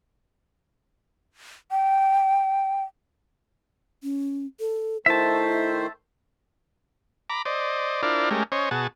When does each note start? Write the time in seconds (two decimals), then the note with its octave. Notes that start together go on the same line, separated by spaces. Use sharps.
1.71 G5
4.03 C#4
4.60 A4
5.06 D#3 A3 E4 C5 E5 A5
7.30 A#5 B5 D6
7.45 C5 D5 D#5
8.03 D4 E4 F4 A#4 C5 D5
8.31 G#3 A3 C#4 G4 A#4
8.52 C#4 C5 C#5 D#5
8.71 B2 F#4 G#4 A5